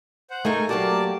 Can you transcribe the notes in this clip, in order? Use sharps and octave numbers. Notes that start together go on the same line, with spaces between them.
C5 F#5
A3 D#4 G#4 A#4 G#5 C#6
F#3 A#3 F#4 G4 D5 A5